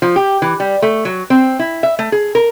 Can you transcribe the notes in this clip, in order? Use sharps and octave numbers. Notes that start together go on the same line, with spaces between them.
F3
G4
E3
G3
A3
F#3
C4
E4
E5
A3
G#4
A#4